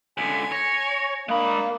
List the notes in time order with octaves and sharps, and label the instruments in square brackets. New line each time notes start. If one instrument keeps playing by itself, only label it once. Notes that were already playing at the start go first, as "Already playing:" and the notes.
[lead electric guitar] C#2 D3 [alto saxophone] G#5 [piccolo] B6
[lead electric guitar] C#5 [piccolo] A#6
[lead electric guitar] G#3 B5 [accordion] A#3 [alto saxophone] D4 [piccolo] D#6